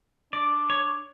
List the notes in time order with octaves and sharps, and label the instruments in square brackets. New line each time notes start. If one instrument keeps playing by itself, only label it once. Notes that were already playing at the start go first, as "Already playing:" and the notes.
[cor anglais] D4 [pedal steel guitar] D5
[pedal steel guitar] C#5